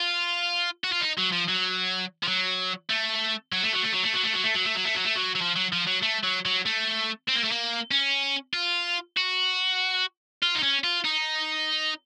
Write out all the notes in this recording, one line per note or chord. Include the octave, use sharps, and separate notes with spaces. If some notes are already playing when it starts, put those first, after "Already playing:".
Already playing: F4
F#4
F4
D#4
F#3
F3
F#3
F3
F#3
A3
F#3
A3
F#3
A3
F#3
A3
F#3
A3
F#3
A3
F#3
A3
F#3
A3
F#3
A3
F#3
F#3
F3
F#3
F3
F#3
A3
F#3
F#3
A3
C4
A#3
A3
A#3
C#4
F4
F#4
F4
D#4
C#4
F4
D#4